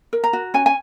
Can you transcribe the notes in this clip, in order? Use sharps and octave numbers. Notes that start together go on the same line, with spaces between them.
A#4
A#5
F#4
C#4 G#5
G#5